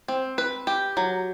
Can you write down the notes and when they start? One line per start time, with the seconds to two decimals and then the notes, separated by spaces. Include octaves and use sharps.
0.08 C4
0.38 B4
0.67 G4
0.97 F#3